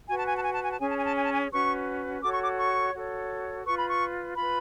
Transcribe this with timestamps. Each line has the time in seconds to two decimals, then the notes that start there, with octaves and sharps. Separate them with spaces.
0.08 F#4 B4 G#5
0.18 A5
0.27 G#5
0.35 A5
0.44 G#5
0.54 A5
0.62 G#5
0.71 A5
0.80 C#4 G#4 C#5 G#5
0.89 A5
0.97 G#5
1.07 A5
1.16 G#5
1.25 A5
1.33 G#5
1.51 C#4 F#4 B4 C#6
2.22 F#4 A4 C#5 D6
2.33 C#6
2.42 D6
2.59 C#6
2.94 F#4 A4 C#5
3.65 F4 B4 C#6
3.78 B5
3.90 C#6
4.37 F4 B4 B5